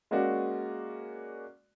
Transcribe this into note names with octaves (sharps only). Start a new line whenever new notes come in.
G#3 A#3 C#4 F#4 D5